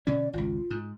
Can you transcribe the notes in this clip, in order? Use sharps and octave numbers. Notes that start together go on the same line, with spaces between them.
B2 D3 C#4 D5
G#1 C#2 F4
G#2